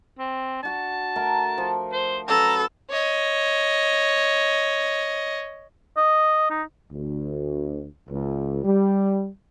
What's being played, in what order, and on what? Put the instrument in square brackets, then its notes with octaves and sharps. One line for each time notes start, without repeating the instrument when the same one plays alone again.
[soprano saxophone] C4
[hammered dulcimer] D4 F#4 F#5 [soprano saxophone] A5
[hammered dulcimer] A3 A#4 F#5
F3
[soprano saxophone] C5
[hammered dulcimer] F#3 C#4 B4 [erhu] A4 [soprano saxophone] A#5
[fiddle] C#5 D#5
[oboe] D#5
D#4
[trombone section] D2
C#2
G3